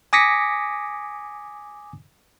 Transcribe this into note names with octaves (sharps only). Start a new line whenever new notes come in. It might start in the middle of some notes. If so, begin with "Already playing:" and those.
G#5 D6 D#6 A#6 B6 C#7